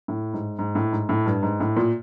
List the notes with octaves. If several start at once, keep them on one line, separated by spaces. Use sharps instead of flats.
A2
G#2
G#2
A2
G#2
A2
G2
G#2
A2
A#2